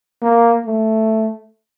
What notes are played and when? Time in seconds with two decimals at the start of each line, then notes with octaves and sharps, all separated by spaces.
0.22 A#3
0.66 A3